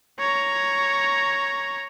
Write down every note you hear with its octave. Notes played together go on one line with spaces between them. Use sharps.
C#5 A#5